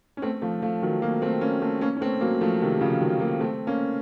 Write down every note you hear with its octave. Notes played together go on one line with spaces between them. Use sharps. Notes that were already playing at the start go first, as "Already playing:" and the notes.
C#4
A3 C4
F3 A3
F3 A3
D#3 F#3
F#3 A#3
A3 C4
A#3 C#4
A3 C4
A#3 C#4
C#4
A3 C4
F#3 A#3
F3 A3
C3 D#3
C#3 F3
D#3 F#3
F#3 A#3
A3 C4
A#3 C#4